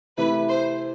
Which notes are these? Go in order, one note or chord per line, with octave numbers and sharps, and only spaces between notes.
C3 E3 A3 E4 B4
C5